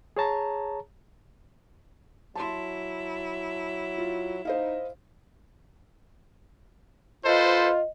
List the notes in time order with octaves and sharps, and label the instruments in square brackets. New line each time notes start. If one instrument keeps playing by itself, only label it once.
[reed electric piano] G#4 C#5 A5 A#5
[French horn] F#3 [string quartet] E4 [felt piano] A5 C6
[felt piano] F4
[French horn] D#4 [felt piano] C5 D#5 F5
[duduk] F4 [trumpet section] A4 B4 C5 [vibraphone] D#5